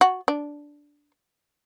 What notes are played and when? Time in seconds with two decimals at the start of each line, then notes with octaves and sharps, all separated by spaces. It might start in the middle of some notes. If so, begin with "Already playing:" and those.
0.01 F#4
0.28 D4